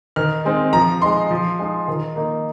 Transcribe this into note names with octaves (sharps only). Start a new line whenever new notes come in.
D#3 F6
G#3 C4 D#4
F3 A#5
G#3 D#4 C6
F3
G#3 D#4
D#3
A#3 D#4